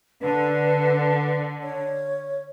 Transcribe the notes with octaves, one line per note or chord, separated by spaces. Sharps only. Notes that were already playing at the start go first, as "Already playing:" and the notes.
D3 B4
C#5